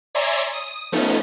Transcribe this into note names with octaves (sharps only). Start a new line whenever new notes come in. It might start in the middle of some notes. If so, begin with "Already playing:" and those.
C#5 D5 E5 G#5 A#5 C6
D#6
F3 A3 B3 C#4 D#4